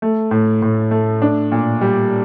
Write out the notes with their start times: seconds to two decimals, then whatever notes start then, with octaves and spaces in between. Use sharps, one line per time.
0.02 A3
0.31 A2
0.62 A2
0.91 A3
1.22 D4
1.52 A#2
1.81 G3